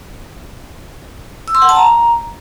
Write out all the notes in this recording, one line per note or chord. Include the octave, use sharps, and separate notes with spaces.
E6
C6
F#5
A5
A#5